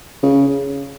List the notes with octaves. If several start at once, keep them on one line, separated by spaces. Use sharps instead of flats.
C#3